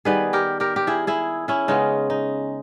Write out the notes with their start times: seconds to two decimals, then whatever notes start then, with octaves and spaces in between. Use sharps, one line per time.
0.05 D#3 G3 B3 G#4 B4
0.33 G4 A#4
0.60 G4 A#4
0.76 G4
0.87 E4 G#4
1.07 E4 G#4
1.48 C#4 E4
1.68 C#3 G#3 B3 D#4
2.10 D#4